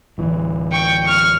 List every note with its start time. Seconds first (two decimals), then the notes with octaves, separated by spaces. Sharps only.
0.18 D1 E3
0.72 G5 C#6
1.06 C#6 F6